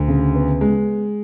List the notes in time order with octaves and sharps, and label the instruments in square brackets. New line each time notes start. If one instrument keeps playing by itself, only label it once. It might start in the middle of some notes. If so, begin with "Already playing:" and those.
Already playing: [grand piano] D2
C#3
B3
G#3